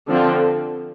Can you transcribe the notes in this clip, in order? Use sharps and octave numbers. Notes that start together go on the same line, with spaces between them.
D3 F3 C4